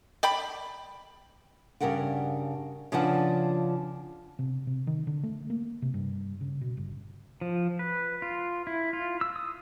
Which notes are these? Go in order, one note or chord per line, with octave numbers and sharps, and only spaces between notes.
D5 G5 B5
G2 C#3 G3 A#4 F#5 G5
C#3 F3 D4 B4 D5 F#5
C3
C3
D#3
D3
A3
A#3
C3
G2
C#3
B2
G1
F3
B4
F4
E4
F4
E6
D#6